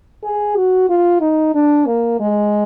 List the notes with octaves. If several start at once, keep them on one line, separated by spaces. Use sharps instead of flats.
G#4
F#4
F4
D#4
D4
A#3
G#3